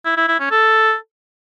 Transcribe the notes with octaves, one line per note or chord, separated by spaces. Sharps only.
E4
E4
E4
C#4
A4